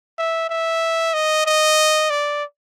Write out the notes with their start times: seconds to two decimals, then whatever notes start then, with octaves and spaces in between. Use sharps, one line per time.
0.18 E5
0.49 E5
1.14 D#5
1.46 D#5
2.10 D5